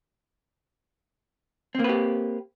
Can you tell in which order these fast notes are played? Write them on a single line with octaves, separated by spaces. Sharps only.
C4 A#3 B4 G4